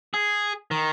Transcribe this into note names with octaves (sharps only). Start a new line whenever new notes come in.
G#4
D#3